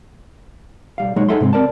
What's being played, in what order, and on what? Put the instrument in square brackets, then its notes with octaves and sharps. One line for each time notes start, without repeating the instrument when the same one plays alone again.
[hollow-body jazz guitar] B1 G3 F5
B1 F#3 G#3 A#3 D#4 C#5
D#4 G#4 A4 E5 F#5 C6
G#2 C3 G#3 C4
C4 A#4 D5 A5